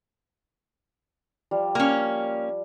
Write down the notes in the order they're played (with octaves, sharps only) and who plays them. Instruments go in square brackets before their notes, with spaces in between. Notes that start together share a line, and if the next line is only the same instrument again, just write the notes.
[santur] F3 G3 F5
[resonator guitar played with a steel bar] A#3 C#4